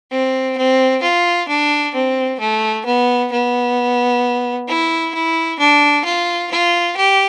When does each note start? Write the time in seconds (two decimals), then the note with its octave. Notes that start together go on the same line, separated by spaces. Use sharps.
0.11 C4
0.57 C4
1.03 F4
1.48 D4
1.94 C4
2.39 A3
2.85 B3
3.32 B3
4.68 E4
5.14 E4
5.59 D4
6.05 F4
6.51 F4
6.97 G4